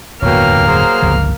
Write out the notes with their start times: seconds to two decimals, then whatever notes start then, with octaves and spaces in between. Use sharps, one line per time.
0.22 D1 E2 G2 B2 A#3 C#4 G5 F6
0.66 F#3 G#4 C5
1.02 G1 C#2 F3